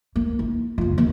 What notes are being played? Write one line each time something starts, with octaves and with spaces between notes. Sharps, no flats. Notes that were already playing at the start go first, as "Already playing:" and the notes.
A#3
E4
F#1 F4
D#2 A#3